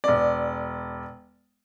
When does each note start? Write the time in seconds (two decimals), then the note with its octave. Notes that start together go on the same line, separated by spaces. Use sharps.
0.04 E1 D5